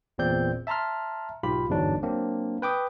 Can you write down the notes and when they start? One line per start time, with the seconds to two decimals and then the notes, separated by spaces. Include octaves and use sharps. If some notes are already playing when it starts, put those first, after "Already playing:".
0.18 G1 E2 A#2 C4 D5 G6
0.67 E5 A5 A#5 C6 F6
1.43 B1 G#2 F4 G4 B5
1.70 G1 E2 G#2 D3 F#3 D4
2.03 F#3 A#3 C4 D4
2.62 B4 G5 D6 D#6